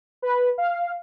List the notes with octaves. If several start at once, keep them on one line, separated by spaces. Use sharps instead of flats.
B4
F5